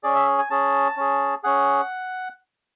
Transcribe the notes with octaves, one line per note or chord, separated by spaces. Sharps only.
C#4 G#4 D5
E5
G#5
C#4 G#4 A5
C#4 G#4
C#4 G#4 F#5